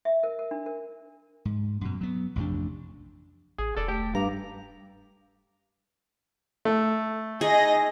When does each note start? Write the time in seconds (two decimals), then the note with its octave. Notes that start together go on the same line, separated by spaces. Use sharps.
0.05 E5
0.23 A#4
0.39 A#4
0.51 D4
0.66 A#4
1.45 G#2
1.81 F#2 B2
2.01 F#3 B3
2.36 A1 F2 C3 D4
3.58 A1 G#4
3.77 E1 A4 D5
3.88 A3 G4
4.15 G2 F5 A#5 D6
6.65 A3
7.41 D#4 G#4 D#5 G#5 A#6